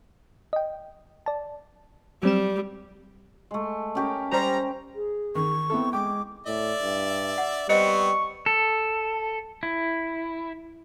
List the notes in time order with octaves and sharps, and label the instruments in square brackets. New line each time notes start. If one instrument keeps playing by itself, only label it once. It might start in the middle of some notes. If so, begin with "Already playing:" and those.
[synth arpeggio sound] D#5 G5
D5 A5
[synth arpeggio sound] F#3 C4 E7 [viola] G3
[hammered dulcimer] G#3 A3
C#4 G4 A#4
[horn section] G3 A#5 [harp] C5
[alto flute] G#4
[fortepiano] D#3 [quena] C#6
[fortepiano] B3 E4 A4 [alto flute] C4
[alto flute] G#3 [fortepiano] G5 [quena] D6
[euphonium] A2 [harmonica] D5 E5
[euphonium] G2
[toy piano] F#5
[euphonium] G3 [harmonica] B3 C4 [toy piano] C5 D#5 [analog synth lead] C#6
[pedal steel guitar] A4
E4